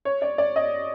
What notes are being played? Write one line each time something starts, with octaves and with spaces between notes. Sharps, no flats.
C#5
D5
D5
D#5